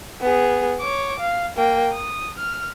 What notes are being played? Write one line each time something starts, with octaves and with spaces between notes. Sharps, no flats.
B3 G#4
C#5 D6
F5
A#3 G5
D#6
F6